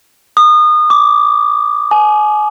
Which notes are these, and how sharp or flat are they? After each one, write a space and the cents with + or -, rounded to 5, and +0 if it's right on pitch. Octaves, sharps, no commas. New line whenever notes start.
D#6 -30
D6 -10
G#5 +30